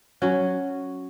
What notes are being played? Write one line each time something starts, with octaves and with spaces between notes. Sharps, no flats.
F#3 C#4 F#4